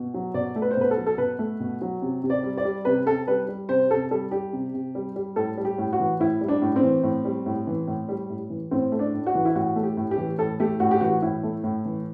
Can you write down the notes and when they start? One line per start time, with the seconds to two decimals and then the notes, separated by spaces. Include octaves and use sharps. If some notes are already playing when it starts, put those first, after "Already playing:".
Already playing: B2
0.14 F#3
0.34 B2 D5
0.56 A3
0.62 B4
0.71 C5
0.77 B2 B4
0.91 A4
0.97 F#3
1.06 A4
1.18 B2 B4
1.39 A3
1.60 B2
1.81 F#3
2.02 C3
2.23 C3
2.30 D5
2.43 G3
2.57 D5
2.65 G3
2.85 C3 B4
3.06 C3 A4
3.27 G3 B4
3.48 G3
3.69 C3 C5
3.91 C3 A4
4.11 G3 A4
4.31 G3 G4
4.53 C3
4.74 C3
4.95 G3
5.16 G3
5.36 A2 A4
5.57 G3
5.65 G4
5.78 A2
5.93 F#4
5.99 E3
6.20 A2 E4
6.41 G3
6.48 D4
6.62 A2
6.76 C4
6.83 E3
7.03 A2
7.25 G3
7.46 A2
7.67 E3
7.87 A2
8.09 G3
8.30 A2
8.50 E3
8.71 A2 C4
8.92 A3
8.99 D4
9.14 A2
9.26 F#4
9.35 E3
9.45 E4
9.55 A2 F#4
9.76 A3
9.83 G4
9.97 A2
10.11 G4
10.18 E3
10.38 A2 A4
10.60 A3 G4
10.80 A2 F#4
10.91 G4
11.01 E3 F#4
11.22 A2 E4
11.43 A3
11.64 A2
11.85 E3